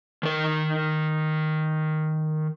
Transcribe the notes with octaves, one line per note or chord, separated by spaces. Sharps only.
D#3 A#4